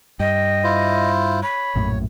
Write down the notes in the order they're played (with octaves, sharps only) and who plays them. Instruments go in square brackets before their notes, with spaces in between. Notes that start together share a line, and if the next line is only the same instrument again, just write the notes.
[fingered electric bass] G2 [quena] D#5 [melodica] G5
[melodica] E4 F4 C5
[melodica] C#5 [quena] B5
[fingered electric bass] A#1 F#2 A2